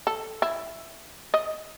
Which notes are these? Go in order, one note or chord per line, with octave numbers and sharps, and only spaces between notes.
A4
E4
D#5